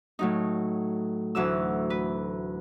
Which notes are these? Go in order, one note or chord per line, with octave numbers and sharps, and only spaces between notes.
A2 F#3 D#4
D2 E3 F#3 E6
B4